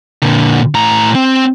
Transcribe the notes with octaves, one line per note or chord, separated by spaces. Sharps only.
A#2 D3
A2 A#5
C4